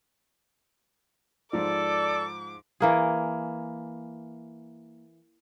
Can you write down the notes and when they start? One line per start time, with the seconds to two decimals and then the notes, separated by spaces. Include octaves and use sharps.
1.53 G#2 F3 A4 D5 D6
2.80 E3 A#3 G#4